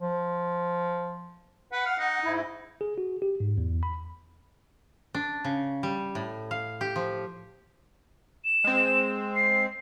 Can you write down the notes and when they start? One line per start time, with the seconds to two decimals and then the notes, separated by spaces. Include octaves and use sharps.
0.01 F3
1.72 B4 F#5
1.86 F5
1.99 D#4
2.24 G#2 E4
2.81 G#4
2.98 F#4
3.22 G4
3.40 G#2
3.58 E2
3.83 B5
5.15 D4
5.45 C#3
5.83 G3
6.15 A2
6.51 F5
6.81 G4
6.96 F3
8.45 E7
8.64 G#3 C4
9.35 C7